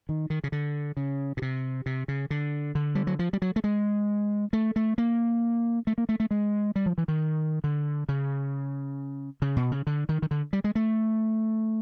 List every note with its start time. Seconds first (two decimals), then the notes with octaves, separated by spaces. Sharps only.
0.09 D#3
0.30 D#3
0.44 C#3
0.52 D3
0.97 C#3
1.37 B2
1.42 C3
1.86 C3
2.08 C#3
2.30 D3
2.75 D3
2.95 G3
3.07 F#3
3.19 F3
3.33 G3
3.42 F#3
3.56 A3
3.64 G#3
4.53 A3
4.76 A3
4.98 A#3
5.87 A3
5.98 A#3
6.09 A3
6.20 A3
6.31 G#3
6.76 G3
6.86 F3
6.98 E3
7.08 D#3
7.64 D3
8.09 C#3
9.42 C#3
9.56 B2
9.72 C#3
9.87 D3
10.09 D#3
10.22 D#3
10.31 D3
10.53 G3
10.64 G#3
10.75 A3